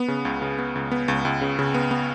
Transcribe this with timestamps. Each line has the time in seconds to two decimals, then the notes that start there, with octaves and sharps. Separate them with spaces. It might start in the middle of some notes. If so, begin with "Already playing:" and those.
Already playing: B3
0.08 C#3
0.25 C#2
0.42 C#3
0.58 B3
0.75 C#2
0.91 B3
1.08 C#2
1.25 C#2
1.41 C#3
1.59 C#3
1.74 B3
1.91 B3